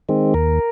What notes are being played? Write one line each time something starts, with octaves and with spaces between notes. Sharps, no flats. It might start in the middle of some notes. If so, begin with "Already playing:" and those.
D#3 G#3 C4
D#2 A#4